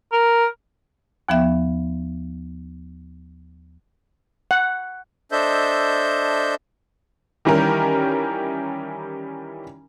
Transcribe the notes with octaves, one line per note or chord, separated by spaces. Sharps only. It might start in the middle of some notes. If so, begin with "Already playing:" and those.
A#4
D#2 F3 B3 E5
F#5
D4 A4 C5 D#5 E5 G6
D#3 E3 G3 C#4 G4 A#4